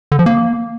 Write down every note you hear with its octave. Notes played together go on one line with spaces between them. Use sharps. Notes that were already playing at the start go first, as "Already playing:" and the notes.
D3
F3
A#3